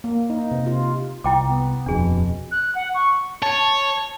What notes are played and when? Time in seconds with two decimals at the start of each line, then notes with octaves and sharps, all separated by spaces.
0.04 A#3
0.30 D#4
0.51 C3
0.66 F4
1.24 C2 E4 G5 D6
1.44 B3
1.86 D#1 F2 B2 D4 G#4
2.51 F#6
2.75 F#5
2.94 C#6
3.42 C#5 A5